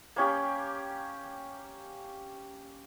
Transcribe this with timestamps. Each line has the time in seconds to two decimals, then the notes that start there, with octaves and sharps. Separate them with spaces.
0.16 A#3 C#4 G4